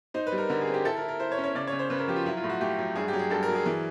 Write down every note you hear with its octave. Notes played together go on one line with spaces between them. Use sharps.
D#4 C5
B4
G3
A#4
D3 A#4
G#4
C4
G4
E4 A4
A#4
E4
A#4
E4 C5
C#5
C#4
C#5
C#3 D5
C#5
C#3
C5
C#3 B4
A#4
F3 G4
F4
F#3 E4
F4
A2
F#4
A3 G4
F#3
G2 G#4
G4
F#3
G#4
G2 A4
A#4
F#3
G#4
E3